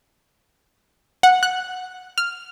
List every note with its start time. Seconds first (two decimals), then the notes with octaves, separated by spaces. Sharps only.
1.23 F#5
1.43 F#6
2.18 F6